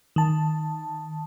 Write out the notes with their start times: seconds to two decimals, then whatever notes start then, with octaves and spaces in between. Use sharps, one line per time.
0.16 D#3 A5